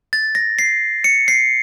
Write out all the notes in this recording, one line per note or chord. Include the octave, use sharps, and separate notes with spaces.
A6
A#6
C7
C#7
C7